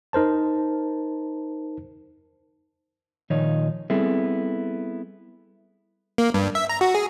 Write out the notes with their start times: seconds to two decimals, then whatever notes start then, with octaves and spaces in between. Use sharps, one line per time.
0.13 D#4 A#4 C5 A5
3.30 D#2 A#2 D#3 F3 D#4 C#5
3.90 G3 B3 C4 E4 G#4 A4
6.18 A#3
6.34 G2
6.55 E5
6.69 A#5
6.81 F#4
6.95 G#4